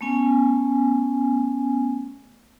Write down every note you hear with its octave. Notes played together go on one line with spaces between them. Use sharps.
A3 B3 C#4 G#5